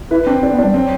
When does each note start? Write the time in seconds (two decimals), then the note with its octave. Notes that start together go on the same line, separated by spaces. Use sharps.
0.11 E4 B4
0.26 C4 D4
0.42 C4 D4
0.53 B3
0.58 D4
0.64 G3
0.74 F#3 C4